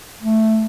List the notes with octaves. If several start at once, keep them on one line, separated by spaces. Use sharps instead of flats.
A3